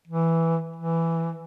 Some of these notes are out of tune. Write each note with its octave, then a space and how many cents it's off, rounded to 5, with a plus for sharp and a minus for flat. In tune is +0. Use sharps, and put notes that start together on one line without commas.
E3 +0
E3 +5